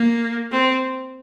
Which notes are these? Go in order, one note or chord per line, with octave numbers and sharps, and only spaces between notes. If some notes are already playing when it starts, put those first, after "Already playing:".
Already playing: A#3
C4